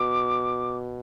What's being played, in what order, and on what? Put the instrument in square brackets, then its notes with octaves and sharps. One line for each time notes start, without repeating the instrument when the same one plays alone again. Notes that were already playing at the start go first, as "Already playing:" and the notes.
Already playing: [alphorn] B2 [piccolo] D6